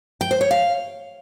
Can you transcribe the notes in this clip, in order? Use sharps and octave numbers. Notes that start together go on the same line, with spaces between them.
G5
C5
C#5
F5